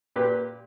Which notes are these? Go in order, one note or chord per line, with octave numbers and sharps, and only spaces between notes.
A#2 G4 B4